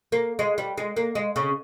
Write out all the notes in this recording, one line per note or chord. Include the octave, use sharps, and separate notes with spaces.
A#3
G#3
G3
G#3
A#3
G#3
C#3